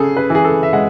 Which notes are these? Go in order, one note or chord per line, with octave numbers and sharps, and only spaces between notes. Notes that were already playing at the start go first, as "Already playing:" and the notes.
Already playing: C#3 G#4 A4
B4
E3 G#4
A4
E5
G#3 F#5